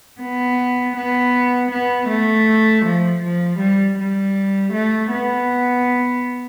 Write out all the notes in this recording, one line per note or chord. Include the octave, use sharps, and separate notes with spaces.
B3
B3
B3
A3
F3
F3
G3
G3
A3
B3